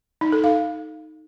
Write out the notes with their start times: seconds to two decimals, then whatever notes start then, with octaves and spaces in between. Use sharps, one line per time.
0.21 D#4
0.32 A4
0.44 F5